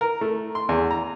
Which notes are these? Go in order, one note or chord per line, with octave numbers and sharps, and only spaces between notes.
A#4
A3
C6
E2
A#5